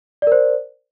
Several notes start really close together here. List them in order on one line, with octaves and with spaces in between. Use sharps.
D5 A#4 C5